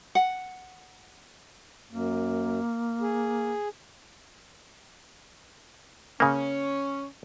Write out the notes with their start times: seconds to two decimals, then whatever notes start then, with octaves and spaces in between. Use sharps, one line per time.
0.15 F#5
1.91 F#2 A#3
3.01 G#4
6.20 C#3 A#3 C#4